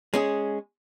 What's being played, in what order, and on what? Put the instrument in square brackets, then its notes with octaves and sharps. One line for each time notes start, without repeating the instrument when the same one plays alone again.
[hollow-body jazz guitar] G#3 C#4 G#4